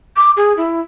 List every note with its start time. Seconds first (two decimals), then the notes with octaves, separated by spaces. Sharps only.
0.16 D6
0.37 G#4
0.57 E4